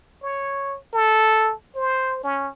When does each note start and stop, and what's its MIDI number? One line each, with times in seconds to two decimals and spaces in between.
0.23 0.77 73
0.94 1.53 69
1.76 2.19 72
2.24 2.49 61